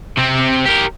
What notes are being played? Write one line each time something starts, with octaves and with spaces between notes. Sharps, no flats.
C3 C4
G4 A#4